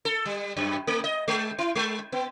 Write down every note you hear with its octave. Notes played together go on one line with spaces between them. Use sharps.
A4
G3
F#2
A3
D#5
G#3
E4
G#3
B3